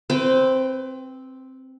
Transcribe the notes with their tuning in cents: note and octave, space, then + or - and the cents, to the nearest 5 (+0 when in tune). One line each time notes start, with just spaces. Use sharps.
C4 +0 B4 +30 G5 +0